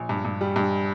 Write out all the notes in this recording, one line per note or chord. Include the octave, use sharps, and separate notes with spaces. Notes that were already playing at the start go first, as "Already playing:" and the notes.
Already playing: A#1
G2
G2
G3
G2